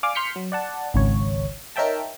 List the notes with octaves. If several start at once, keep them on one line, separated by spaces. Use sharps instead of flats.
D5 F5 G#5 D6
C6 F6 G6 B6 C#7
F#3
D5 F#5 A5
G#1 C#2 C#5
D#4 A#4 C#5 E5 G5 A5